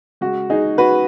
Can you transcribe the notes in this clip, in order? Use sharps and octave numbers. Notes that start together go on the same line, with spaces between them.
C#3 G#3 F#4
D#4 G#4
F#4 B4